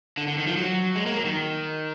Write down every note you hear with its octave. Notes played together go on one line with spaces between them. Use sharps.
D3
D3
D#3
F3
F#3
G#3
A#3
F#3
D#3